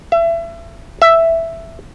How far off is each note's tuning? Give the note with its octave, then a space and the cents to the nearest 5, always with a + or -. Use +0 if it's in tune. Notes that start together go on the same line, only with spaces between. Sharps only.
E5 +30
E5 +5